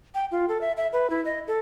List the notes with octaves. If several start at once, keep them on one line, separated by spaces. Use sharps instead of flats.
G5
F4
A4
E5
E5
B4
E4
D#5
A4